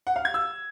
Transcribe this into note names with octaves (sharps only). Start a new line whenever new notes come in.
F#5
F5
G#6
E6